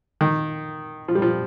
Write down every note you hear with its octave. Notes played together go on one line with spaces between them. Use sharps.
D#3
F3
G3
F3